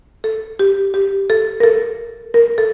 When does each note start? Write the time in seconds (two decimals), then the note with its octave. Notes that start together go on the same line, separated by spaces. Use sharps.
0.24 A4
0.59 G4
0.94 G4
1.30 A4
1.60 A#4
1.64 A4
2.34 A#4
2.58 A4